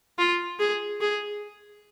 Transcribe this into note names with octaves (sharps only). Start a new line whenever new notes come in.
F4
G#4
G#4